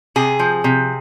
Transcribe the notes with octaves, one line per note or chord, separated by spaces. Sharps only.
C3 G#4
F3
C3